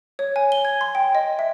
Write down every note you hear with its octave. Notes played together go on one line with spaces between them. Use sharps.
C#5
G#5
G7
G#6
C6
G5
D#5
E5